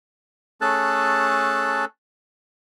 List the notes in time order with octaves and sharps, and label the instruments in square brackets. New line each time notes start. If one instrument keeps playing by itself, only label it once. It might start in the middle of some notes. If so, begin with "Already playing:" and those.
[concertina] A3 C#4 G#4 A4 A5 F#6